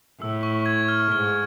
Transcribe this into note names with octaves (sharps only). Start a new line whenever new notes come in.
A2 E6
C#6
G#6
F6
G#2 F6